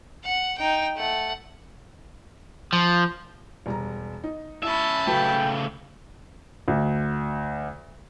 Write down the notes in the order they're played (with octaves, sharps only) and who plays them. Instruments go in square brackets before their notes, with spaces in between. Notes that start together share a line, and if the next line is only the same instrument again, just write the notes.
[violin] F#5
D#4 G5
A3 F#5
[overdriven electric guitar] F3
[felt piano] E1 G3 A#5
D#4
[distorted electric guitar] C#4 E5 [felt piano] E4 [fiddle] A5 B5
[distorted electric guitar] C#3 A3 [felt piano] F#3 F#4 B4 [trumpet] G5
[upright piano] D2